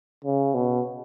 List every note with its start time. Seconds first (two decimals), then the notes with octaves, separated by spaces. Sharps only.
0.25 C#3
0.55 B2